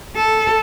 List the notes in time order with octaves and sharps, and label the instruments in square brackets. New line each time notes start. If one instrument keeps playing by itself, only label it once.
[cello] A4